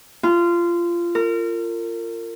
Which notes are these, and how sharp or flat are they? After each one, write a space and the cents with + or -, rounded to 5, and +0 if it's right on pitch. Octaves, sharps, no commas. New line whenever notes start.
F4 -20
A#4 -30